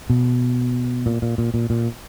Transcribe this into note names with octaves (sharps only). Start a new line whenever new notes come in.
B2
A#2
A#2
A#2
A#2
A#2